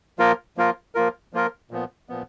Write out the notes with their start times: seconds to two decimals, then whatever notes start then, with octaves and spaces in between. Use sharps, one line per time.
0.19 F3 A#3 F4 A#4
0.57 F3 A#3 F4 A#4
0.95 F3 A#3 F4 A#4
1.33 F3 A#3 F4 A#4
1.71 A#2 F3 B3
2.09 A#2 F3 B3